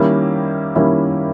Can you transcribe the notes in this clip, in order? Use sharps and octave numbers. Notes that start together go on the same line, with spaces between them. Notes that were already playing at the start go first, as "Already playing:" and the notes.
Already playing: D#3 G3 A#3 C#4 E4
D#3 G3 A#3 C#4 E4